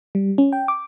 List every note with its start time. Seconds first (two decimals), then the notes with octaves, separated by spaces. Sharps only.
0.15 G3
0.38 C#4
0.53 G5
0.68 D6